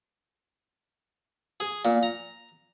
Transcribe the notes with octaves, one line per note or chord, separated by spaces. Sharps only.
G#4
A#2
A#5